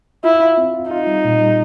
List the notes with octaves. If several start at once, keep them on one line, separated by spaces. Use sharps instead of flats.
E4 F4
F4
C4
F4
D#4 F4
G3
A#2
G3